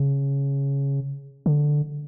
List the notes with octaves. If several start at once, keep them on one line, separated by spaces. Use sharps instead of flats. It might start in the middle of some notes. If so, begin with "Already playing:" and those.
Already playing: C#3
D3